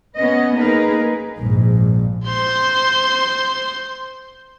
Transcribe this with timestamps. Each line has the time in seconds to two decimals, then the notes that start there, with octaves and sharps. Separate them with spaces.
0.16 B3 C#4 B4 D#5
0.55 A#3 D#4 G#4 A#4 B4
1.38 A#1 G#2
2.27 C5 C6